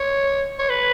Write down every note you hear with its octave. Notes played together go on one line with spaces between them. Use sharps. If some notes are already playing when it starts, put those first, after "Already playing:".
Already playing: C#5
C#5
B4